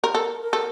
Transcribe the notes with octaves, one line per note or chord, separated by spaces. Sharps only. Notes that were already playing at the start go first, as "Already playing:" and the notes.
A#4
A4 A#4
A#4
A4